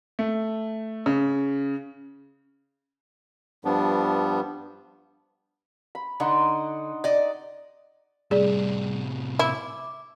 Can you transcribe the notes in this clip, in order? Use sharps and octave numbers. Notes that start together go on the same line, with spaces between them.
A3
C#3
G2 F3 G3 B3 D4
B5
D3 D#4 F#5 C6
D5 D#5
A2 C3 G3 G#4 D5
E4 E5 D6